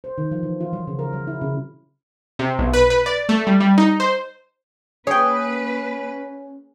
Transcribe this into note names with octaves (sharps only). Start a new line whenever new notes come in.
C5
D#3
F3
E3
F4
F#3
C#3
A#4
F#3
E4
C#3
C3
B1
B4
B4
D5
A3
G3
G3
D#4
C5
A#3 C#4 G#4 B4 C#5 G5